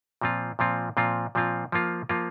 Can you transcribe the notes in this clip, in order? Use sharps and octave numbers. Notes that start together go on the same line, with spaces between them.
A#2 F3 C4 F4
A#2 F3 C4 F4
A#2 F3 C4 F4
A#2 F3 C4 F4
F3 A#3 F4
F3 A#3 F4